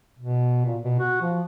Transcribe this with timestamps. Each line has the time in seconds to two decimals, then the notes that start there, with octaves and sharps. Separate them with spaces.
0.19 B2
0.66 A#2
0.84 B2
0.99 F#4
1.21 F3